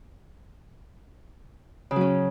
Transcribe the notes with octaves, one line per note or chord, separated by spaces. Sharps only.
C#3
F#3
C#4